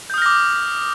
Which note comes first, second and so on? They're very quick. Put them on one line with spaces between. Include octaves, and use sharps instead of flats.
G6 D#6 F6 A#6 D6